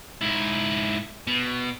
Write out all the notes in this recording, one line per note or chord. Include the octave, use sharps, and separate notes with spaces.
G#2 E4
B2